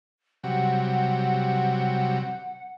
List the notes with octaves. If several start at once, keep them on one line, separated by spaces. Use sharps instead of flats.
C3 F#3 G3 F#5